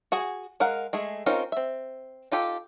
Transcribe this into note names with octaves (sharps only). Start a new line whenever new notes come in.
F#4 G#4 G#5
G#3 A#4 F5 F#5
G#3 A3 G#4
C4 C#4 D#4 F4 A#4
C4 E5
D#4 F4 G4 A4